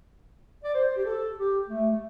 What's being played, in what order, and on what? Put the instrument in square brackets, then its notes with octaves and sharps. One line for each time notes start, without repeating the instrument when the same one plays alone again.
[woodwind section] D5
C5
G4
A4
G4
A3
A3